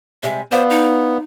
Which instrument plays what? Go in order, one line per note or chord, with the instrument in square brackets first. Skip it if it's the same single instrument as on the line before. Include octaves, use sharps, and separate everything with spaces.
[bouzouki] C3 G3 G#3 [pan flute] E5
[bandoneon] B3 [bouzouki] E4 F4 D5 [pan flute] C5
[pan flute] D#4